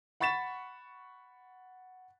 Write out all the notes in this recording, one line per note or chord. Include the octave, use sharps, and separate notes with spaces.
F#5 B5 C#6 A6 B6 E7